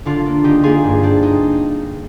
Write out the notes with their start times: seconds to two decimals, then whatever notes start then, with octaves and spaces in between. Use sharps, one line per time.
0.05 D3 D4 F4
0.26 A#3
0.44 D3 D#4 G4
0.63 A#3 F4 G#4
0.84 G2
1.03 C4 D4
1.23 D#4